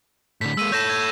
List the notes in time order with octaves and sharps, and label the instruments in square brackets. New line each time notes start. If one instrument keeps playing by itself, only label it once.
[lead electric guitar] A2 D3 [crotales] B6
[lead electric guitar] G#3 A#3 [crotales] E6 D#7
[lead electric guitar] A4 C#5 [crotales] G6 A#6 E7
[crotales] G#6